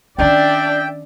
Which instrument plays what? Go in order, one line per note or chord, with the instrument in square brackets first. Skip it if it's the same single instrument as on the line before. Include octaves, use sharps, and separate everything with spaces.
[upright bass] D#3 C#4 [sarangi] D4 [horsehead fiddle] D5 E5 [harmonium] G5